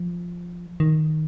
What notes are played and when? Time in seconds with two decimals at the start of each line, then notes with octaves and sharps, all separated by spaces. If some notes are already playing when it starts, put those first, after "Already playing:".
Already playing: F3
0.80 D#3